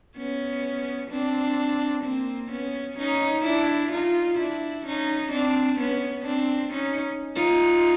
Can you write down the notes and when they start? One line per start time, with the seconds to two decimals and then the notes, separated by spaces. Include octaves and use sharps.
0.17 B3 C#4
1.10 C4 D4
2.04 A#3 C4
2.51 B3 C#4
2.98 C#4 D#4
3.45 D4 E4
3.92 D#4 F4
4.39 D4 E4
4.86 C#4 D#4
5.32 C4 D4
5.80 B3 C#4
6.26 C4 D4
6.73 C#4 D#4
7.36 D#4 F4